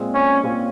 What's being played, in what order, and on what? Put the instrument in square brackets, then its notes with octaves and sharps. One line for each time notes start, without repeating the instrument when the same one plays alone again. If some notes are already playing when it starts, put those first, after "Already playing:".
Already playing: [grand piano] A#2 G#3 C4 F4
[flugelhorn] C#4
[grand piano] A#2 G#3 C4 F4